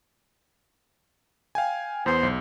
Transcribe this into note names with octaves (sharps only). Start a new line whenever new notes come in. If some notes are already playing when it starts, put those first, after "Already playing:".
F5 G5 G#5
E2 B3 C5
B1